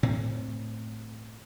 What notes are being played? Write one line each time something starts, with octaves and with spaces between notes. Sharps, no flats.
A2 C4